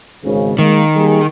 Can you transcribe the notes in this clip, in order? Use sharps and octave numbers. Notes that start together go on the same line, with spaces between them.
G#1 C#3
D#3 G#3 A#3
G3 A#3 G#4